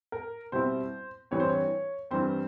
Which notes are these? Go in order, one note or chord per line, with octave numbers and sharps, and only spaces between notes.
A#4
B2 G3 C4 E4 C5
G2 E3 G3 C4 C#5
C5
C#5
G2 E3 G3 C4 C5